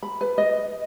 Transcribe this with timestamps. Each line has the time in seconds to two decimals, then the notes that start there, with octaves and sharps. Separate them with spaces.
0.03 B5
0.21 B4
0.38 D#5